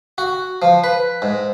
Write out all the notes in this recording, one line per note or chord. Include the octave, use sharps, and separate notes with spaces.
F#4
F3
B4
G#2